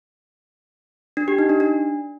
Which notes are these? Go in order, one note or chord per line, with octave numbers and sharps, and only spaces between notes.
D4
G4
D#4
D4
D4